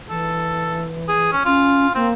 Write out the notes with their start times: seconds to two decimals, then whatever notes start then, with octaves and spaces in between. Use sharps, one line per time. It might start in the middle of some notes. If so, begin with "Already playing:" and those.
0.10 E3 A4
1.08 G#4
1.32 C#4
1.45 C#4 F4
1.95 A#3 C4